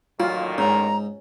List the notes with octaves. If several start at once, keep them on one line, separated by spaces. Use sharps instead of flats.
A1 A#2 D#3 F#3 F4
G#2 C#4 A#5